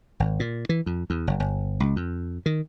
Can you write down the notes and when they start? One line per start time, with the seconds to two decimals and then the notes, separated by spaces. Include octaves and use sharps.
0.20 G#1
0.40 A#2
0.69 E3
0.86 F2
1.10 E2
1.27 F#1
1.40 G1
1.80 C#2
1.96 F2
2.46 D#3